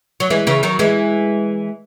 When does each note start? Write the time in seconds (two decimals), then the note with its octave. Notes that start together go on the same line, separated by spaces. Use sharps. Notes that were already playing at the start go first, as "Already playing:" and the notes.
0.20 F#3
0.30 E3 G#3
0.47 C#3 E3
0.63 D#3 F#3
0.79 E3 G#3